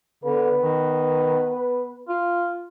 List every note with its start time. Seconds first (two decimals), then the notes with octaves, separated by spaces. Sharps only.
0.24 D3 B3 B4
0.63 D#3
2.09 F4